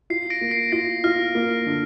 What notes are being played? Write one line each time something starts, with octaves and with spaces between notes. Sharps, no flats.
F4 C7
A#6 D7
A#3
C7
F4 A#6
F4 F6
A#3
D3